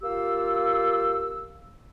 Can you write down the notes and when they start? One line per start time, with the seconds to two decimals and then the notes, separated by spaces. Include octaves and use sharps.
0.02 A#3 F4 G4 F5 E6